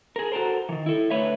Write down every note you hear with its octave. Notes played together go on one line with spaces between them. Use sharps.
G#4 A#4
F#4 A4 A#4 C5
D#3 E3
E4 A4
D3 A3 B4 C#5 E5